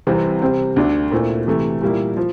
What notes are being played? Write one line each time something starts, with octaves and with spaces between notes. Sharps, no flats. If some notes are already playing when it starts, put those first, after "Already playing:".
C2 C3 E3 G3 C4
C3 G3 C4
D2 D3 A3 D4
A#2 A3 C4 E4
C3 E3 A3
A#2 G3 A#3 E4
F3